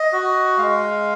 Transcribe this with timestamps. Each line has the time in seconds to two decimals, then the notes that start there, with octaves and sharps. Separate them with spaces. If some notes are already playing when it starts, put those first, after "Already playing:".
Already playing: D#5
0.13 F#4
0.58 G#3 F5